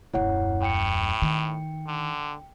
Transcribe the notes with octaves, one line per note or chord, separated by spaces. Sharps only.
D#1 F#2 E4 C#5 F#5
A2 G5 C#7
D#3
D3